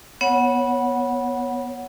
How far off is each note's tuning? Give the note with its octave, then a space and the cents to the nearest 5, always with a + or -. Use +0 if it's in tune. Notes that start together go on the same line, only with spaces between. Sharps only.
B3 -15 C#5 +0 F#5 +0